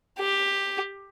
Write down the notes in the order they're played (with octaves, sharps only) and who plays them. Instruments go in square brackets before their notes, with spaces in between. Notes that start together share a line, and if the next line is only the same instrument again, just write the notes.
[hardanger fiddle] G4